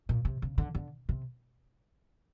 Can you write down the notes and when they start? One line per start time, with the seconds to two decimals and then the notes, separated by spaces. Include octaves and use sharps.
0.09 A#2
0.25 C3
0.42 C#3
0.58 D3
0.75 D3
1.09 C3